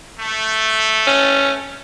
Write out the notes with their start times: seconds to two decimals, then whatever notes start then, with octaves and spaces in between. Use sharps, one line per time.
0.20 A3
1.07 C#4